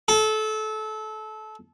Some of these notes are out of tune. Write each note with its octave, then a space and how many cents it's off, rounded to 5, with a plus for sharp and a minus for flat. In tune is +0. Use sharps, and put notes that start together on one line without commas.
A4 -25